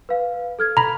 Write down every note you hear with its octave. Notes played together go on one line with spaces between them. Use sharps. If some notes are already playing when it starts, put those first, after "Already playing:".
B4 F5
A4 F6 G#6
A#5 B5